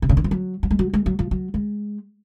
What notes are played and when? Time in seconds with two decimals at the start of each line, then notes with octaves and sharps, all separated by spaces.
0.02 C3
0.09 C#3
0.17 D#3
0.24 F3
0.31 F#3
0.63 F#3
0.71 G#3
0.79 F#3
0.94 G#3
1.06 F#3
1.19 F3
1.31 F#3
1.54 G#3